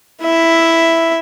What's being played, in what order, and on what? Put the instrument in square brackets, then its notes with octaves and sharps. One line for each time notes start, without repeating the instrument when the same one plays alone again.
[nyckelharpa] E4 E5